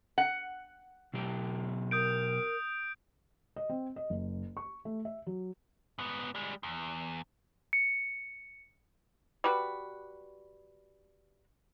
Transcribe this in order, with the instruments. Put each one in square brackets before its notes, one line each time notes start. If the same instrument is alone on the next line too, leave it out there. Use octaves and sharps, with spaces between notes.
[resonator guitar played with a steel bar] F#5
[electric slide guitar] B2 F#3 G4
[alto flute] A#4 [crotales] D#6 G6 D7
[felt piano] D#5
C4
D#5
F#1
C#6
A3
E5
F#3
[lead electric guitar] G#2 B3
G3 G#3
E2
[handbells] C#7
[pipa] G3 F#4 B4